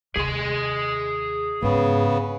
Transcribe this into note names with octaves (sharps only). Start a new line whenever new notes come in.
D#2 C3 G#4 C6
G#2 C#3 B3